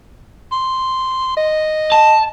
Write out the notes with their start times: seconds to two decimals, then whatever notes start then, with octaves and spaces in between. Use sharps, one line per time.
0.52 C6
1.37 D#5
1.92 A5